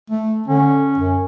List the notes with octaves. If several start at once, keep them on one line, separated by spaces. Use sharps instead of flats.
A3
D3 C#4
F#2